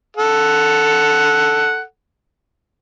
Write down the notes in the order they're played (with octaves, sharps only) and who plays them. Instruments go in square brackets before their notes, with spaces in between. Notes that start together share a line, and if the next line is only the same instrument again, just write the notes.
[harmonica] A4 F#5